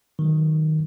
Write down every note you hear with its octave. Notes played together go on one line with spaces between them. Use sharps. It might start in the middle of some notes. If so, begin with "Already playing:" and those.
D#3 F#3